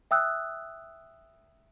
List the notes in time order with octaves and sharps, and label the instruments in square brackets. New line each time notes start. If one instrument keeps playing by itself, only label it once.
[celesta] E5 G5 D#6 E6 F#6